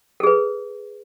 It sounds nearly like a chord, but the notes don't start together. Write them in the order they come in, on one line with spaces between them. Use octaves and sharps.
A4 G#4 B4